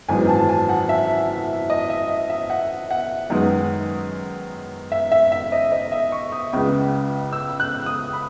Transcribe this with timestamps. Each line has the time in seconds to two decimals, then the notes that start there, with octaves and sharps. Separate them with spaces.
0.09 G#1 F#2 E3 G#3 B3 G#5
0.29 A5
0.49 G#5
0.69 F#5
0.89 E5
1.70 D#5
1.90 E5
2.10 E5
2.30 E5
2.50 F#5
2.91 F#5
3.30 F#2 D#3 G#3 B3
4.92 E5
5.12 E5
5.32 E5
5.52 D#5
5.72 D#5
5.92 E5
6.12 C#6
6.32 D#6
6.53 C#2 C#3 G#3 B3
7.33 E6
7.60 F#6
7.86 D#6
8.13 B5